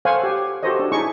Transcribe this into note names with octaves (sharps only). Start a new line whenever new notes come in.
A4 C5 C#5 F5 F#5 G#5
G4
F#4 G4 A4 C5 C#5 D#5
D4
D#4 E4 G#4 C#6